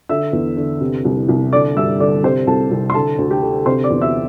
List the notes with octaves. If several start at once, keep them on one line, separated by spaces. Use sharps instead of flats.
D3 E5 E6
E2
D3
C3
C2
C2
D3 D5 D6
G2 E5 E6
D3 D5 D6
C3 C5
C2 A4 A5
C2
C6
D3 A4 A5
D2
G4 G5
D3
C3 C5 C6
D5 D6
E2
E5 E6